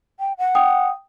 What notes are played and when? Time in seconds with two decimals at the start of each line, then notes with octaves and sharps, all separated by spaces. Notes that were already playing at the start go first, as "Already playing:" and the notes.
0.20 G5
0.38 F#5
0.55 G5 D#6